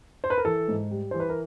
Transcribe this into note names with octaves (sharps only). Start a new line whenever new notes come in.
C5
B4
A#4
E3 A4
G#2
G3
E3 C5
B4
A#4